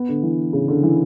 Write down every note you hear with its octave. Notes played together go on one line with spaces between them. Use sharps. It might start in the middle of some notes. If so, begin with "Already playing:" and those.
Already playing: B3
D3
E3
C#3
D3
E3